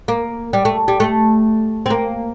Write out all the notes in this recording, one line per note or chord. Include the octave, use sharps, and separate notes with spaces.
A#3
G3
A3
G3
A3
C4
A#3